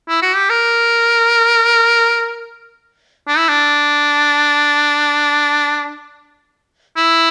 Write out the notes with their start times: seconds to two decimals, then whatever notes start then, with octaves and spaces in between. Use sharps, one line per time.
0.09 E4
0.22 F#4
0.36 G4
0.50 A#4
3.28 D4
3.38 E4
3.48 D4
6.97 E4